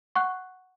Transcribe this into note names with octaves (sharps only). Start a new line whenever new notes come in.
F#5 C#6 F#6